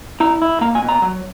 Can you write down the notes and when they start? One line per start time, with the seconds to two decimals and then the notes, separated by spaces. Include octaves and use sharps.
0.20 E4 A#5
0.42 E4
0.61 A#3 A#5
0.75 G#5
0.82 B2
0.89 A#5
1.02 F#3